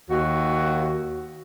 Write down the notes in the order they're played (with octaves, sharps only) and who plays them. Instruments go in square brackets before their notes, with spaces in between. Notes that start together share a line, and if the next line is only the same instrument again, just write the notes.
[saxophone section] D#2 F#4